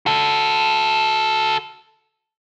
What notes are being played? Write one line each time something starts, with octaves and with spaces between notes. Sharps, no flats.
F#4 A4